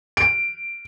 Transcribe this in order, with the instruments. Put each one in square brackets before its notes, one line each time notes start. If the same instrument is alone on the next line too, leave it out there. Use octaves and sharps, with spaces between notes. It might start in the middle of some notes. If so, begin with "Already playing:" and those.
[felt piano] D7